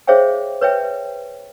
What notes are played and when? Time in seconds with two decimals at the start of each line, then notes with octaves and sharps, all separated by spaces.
0.07 G#4 C5 C#5 E5 F5 G5
0.61 B4 C#5 E5 G5